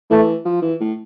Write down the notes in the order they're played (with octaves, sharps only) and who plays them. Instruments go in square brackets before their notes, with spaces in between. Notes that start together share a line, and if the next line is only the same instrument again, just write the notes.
[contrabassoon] E3 [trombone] A3
[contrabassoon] F3
E3
A2